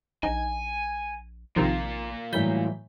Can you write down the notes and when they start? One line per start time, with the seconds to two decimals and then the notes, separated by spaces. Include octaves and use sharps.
0.23 A#1 D#4 G#5
1.56 A#1 C3 D#3 F3 A#3 F4
2.33 A2 E3 F#3 G3 G6 B6